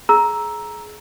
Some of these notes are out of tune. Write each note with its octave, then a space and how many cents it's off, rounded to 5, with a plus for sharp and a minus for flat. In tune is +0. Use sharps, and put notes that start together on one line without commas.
G#4 +25 A#5 +10 E6 +0